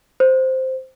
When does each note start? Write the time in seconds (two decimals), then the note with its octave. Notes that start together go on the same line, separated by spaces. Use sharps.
0.20 C5